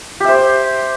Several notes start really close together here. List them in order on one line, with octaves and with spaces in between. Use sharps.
G4 E5 C5